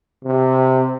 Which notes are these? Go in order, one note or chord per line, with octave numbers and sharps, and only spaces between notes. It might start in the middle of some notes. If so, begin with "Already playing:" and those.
C3